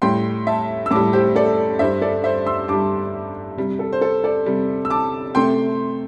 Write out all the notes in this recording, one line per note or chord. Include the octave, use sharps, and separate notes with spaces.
A2 G3 G5 C6
E5 A5
E6
A2 G3 A5 D6
G4 C5
A4 D5
G2 G3 C5 E5
A4 D5
C5 E5
C6 E6
G2 G3 A5 D6
C3 G3
A4
C5
A4
A4 D5
C3 G3
E6
A5 D6
C3 A3 G5 C6